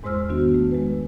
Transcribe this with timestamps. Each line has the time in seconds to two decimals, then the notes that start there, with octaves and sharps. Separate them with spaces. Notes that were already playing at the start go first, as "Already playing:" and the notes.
0.03 E2 G#2 G#3 C5 E6 F6
0.29 D#3 B3 D4 F#4
0.54 A3
0.71 G#3 B4